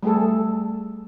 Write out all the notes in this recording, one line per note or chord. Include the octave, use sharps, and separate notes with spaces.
G3 A3 G#4 A4